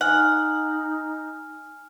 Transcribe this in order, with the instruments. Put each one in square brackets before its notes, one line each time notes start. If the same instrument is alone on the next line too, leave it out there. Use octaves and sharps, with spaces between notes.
[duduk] D#4 [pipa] F#5 [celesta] G#5 F6